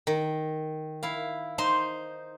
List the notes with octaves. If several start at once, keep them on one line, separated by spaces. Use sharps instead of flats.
D#3
E4 F5
D#4 C5 C6